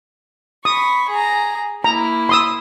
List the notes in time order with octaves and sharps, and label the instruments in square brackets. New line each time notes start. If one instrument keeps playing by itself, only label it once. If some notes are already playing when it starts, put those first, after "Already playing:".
[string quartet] B5 C#6 [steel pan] D#6
[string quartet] G#4 A#5
[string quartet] A#3 E4 [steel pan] A#5
[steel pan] C6 D#6 E6